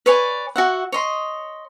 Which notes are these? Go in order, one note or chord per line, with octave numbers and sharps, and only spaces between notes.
B4 C#5 D5 G#5
F#4 E5 F#5
C#5 D#5 C6